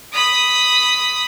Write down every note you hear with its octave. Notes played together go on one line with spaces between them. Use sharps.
B5 D#6